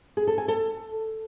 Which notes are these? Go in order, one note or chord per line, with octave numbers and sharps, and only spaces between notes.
G#4
A4
G#5
A4